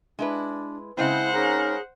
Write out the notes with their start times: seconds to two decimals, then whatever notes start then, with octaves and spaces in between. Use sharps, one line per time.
0.19 G#3 D4 E4 B4
0.97 C#3 G#3 C4 E4 C5 F#5
1.34 C#4 D#4 G#4 A#4